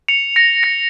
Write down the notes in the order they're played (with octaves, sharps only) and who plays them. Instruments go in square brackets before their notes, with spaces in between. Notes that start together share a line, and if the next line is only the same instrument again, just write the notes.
[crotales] C#7 F7
A#6 C#7
A#6 C#7